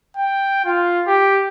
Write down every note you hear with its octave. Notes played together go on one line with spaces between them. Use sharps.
G5
F4
G4